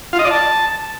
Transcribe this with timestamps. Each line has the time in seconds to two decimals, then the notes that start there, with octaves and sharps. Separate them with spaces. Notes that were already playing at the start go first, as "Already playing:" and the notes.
0.13 F4
0.19 D#5
0.25 D5
0.31 A5